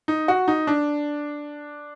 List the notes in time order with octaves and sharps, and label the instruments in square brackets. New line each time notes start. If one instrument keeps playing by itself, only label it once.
[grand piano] D#4
F#4
D#4
D4